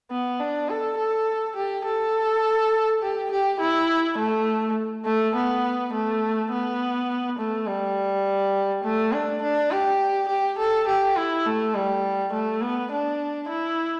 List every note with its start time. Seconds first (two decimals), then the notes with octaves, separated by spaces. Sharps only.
0.11 B3
0.40 D4
0.69 A4
0.98 A4
1.56 G4
1.85 A4
3.02 G4
3.31 G4
3.60 E4
4.18 A3
5.05 A3
5.35 B3
5.93 A3
6.51 B3
7.39 A3
7.67 G3
8.84 A3
9.13 D4
9.42 D4
9.71 G4
10.29 G4
10.59 A4
10.88 G4
11.16 E4
11.46 A3
11.75 G3
12.33 A3
12.62 B3
12.92 D4
13.49 E4